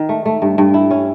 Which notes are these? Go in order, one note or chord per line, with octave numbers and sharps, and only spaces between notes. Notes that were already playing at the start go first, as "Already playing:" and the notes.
Already playing: D#3
A3
A3
G2
G2
E4
C#4